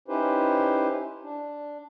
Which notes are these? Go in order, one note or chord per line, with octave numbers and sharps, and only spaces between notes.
C#4 D#4 E4 G4 B4 C5
D4